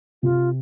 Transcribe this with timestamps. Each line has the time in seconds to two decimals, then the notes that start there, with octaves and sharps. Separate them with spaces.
0.23 C3 F4